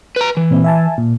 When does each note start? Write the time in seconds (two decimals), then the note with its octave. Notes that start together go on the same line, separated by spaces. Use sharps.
0.16 B4 A#5
0.37 E3
0.51 A#2 C4
0.64 E5 G#5 A5
0.98 A#2